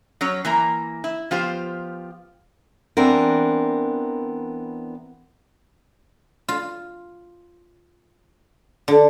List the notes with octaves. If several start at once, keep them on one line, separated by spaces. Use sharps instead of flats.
F#3 C#4 C#5
E3 A#3 A#5
E4
F3 B3 F4 G4 C5
E3 B3 C4 D4 A#4
F4
D3